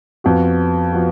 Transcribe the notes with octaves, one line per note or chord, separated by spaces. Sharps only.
F2 F3 B3 F#4
F3 B3 F#4